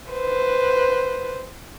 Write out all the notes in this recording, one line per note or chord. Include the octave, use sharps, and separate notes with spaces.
B4 C5